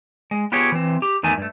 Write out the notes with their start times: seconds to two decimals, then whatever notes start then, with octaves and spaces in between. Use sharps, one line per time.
0.31 G#3
0.52 B3 F4 G4 G#4 C#5
0.72 E3 C4
1.02 G4
1.23 E2 D#3 A3 G#5
1.38 G2 A3